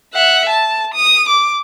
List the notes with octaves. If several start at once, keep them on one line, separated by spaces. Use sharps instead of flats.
E5 F#5
A5
D#6
D6